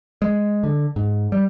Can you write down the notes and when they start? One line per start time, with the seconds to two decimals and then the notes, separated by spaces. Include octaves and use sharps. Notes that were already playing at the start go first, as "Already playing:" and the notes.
0.22 G#3
0.63 D3
0.96 G#2
1.32 G3